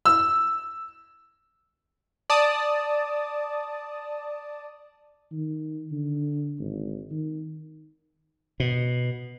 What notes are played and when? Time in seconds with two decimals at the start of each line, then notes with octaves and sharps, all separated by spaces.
0.05 E6
2.30 D5 A5 D#6
5.32 D#3
5.92 D3
6.59 G#1
7.11 D#3
8.60 B2